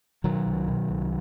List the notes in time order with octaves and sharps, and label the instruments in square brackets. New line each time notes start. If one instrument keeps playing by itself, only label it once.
[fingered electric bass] B2 D#3 F#3
C2
B2
C2